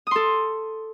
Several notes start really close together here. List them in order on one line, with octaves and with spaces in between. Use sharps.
D#6 C6 A4